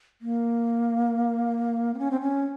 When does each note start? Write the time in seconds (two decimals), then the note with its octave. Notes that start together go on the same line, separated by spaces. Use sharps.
0.22 A#3
1.94 C4
1.99 C#4
2.11 C4
2.21 C#4